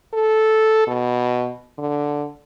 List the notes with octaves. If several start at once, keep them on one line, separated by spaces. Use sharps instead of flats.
A4
B2
D3